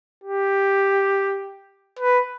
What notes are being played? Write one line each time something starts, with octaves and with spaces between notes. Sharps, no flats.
G4
B4